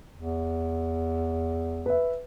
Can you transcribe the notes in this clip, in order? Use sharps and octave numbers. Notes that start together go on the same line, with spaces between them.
E2
B4 E5